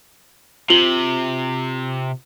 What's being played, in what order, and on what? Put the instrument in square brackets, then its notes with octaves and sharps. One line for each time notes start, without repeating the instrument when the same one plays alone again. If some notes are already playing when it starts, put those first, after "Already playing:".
[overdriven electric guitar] C3 [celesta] F4 F#7 G7